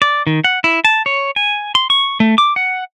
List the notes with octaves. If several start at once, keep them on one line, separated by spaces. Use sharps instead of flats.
D5
D#3
F#5
E4
A5
C#5
G#5
C6
C#6
A3
D6
F#5